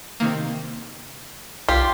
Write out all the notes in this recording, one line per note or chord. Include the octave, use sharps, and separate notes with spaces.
C3 D#3 A#3
B1 F4 G4